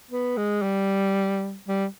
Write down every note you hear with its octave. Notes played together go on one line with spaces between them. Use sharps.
B3
G#3
G3
G3